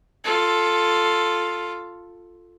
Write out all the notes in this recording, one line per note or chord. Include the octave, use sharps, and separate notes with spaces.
F4 A4